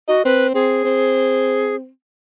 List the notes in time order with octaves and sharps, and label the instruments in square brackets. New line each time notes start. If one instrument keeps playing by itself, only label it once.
[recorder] F#4 [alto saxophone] D#5
[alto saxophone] C4 [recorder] B4
[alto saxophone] C4 [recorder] G#4
[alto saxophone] C4